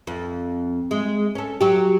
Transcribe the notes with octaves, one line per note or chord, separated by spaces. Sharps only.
F2
G#3
C#4 A4
F#3 G4